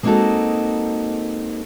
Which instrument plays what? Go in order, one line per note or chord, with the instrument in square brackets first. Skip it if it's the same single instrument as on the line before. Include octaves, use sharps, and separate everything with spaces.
[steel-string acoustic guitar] G#3 A#3 C4 D#4 F#4 A4